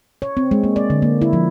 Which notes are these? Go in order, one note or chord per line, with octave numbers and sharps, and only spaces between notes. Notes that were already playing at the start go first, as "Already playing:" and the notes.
C#5
C4
G#3
A#3
D5
D3
A#3
E4
F3